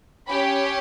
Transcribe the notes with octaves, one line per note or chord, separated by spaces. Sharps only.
C#4 G4 B5